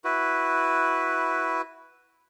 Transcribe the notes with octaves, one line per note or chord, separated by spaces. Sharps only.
E4 F#4 B4